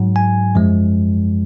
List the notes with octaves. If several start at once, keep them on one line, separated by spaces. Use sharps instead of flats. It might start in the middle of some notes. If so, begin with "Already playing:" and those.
Already playing: G#2 F#3
G#5
F#2 F3 G#3